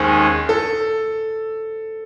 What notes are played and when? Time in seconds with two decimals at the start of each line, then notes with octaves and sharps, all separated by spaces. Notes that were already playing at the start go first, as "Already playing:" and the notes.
Already playing: D#2 D#3 G#3 C#4 C5
0.49 A4